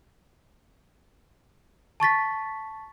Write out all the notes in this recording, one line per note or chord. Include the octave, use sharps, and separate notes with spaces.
A5 C#6 A6 B6